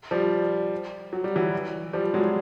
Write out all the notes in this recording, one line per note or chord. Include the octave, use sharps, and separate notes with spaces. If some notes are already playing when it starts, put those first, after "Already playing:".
F3 G3
F#3
G3
E3 F#3
F3 G3
F#3 G#3